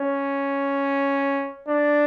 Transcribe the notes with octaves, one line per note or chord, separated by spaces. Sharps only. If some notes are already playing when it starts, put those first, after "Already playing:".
Already playing: C#4
D4